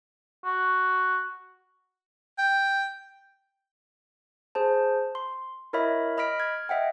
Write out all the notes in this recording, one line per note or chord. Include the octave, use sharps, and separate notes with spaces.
F#4
G5
G#4 C5 A5
C6
E4 A#4 C#5 D#5 E5 B5
D#5 B5 F6 B6 D7
F6 G#6
D#5 E5 F#5 G5